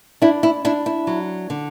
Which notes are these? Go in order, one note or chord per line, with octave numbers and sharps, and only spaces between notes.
D4 E4
E4
D4 E4
E4
F#3
D3